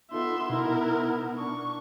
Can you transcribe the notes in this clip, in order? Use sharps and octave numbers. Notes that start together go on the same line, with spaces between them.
B3 D#4 F4 A4 E5 C6
B2 D#4 E4 A#4 E5
D4 C#6